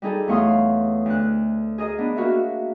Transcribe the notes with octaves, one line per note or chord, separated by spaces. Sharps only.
G3 D#4 G#4 A4
E2 A3 C#5 F5 C6 D#6
D2 F#6
G#4 A#4 D#5
B3 D4
A#3 F#4 A#4 E5